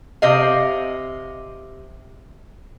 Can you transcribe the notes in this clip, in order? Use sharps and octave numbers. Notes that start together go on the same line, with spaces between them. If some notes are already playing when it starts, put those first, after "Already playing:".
C3 D#5 F5